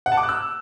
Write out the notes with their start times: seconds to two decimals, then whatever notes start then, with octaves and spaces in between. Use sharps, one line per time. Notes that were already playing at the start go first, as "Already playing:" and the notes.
0.06 F#5
0.12 A5
0.17 D6
0.23 F#6
0.29 E6